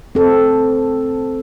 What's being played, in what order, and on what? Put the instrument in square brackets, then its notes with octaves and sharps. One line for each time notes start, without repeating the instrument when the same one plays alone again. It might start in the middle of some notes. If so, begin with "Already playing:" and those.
[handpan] C4 A4